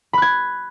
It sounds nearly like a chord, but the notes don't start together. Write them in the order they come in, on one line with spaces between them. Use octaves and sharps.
B5 F#6 G#6